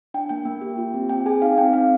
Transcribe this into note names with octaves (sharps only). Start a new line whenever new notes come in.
D4 G5
A#3 G5
A#3
G4
F4
C4
C4 G5
G#4 G#5
D#4 F5
C4 G5
C4 F5